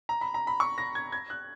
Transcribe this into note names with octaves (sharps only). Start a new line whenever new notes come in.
A#5
B5
A#5
B5
C#6
A#6
G#6
G#6
F#6